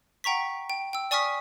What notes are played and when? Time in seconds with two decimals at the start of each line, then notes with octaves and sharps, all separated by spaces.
0.24 F#5 G5 A#5 C#6 B6
0.70 G5
0.93 G5 E6
1.11 D5 G#5 C#6 D#6 F6 B6